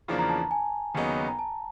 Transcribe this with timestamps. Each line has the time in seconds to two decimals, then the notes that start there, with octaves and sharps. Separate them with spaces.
0.08 E2 C#3 F3 A#3 D4
0.19 A#5
0.30 A5
0.51 G#5
0.95 D#2 C#3 F#3 B3 D#4
1.28 A#5
1.39 A5